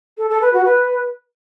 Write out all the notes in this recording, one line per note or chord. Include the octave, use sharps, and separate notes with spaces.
A4
A4
B4
F#4
B4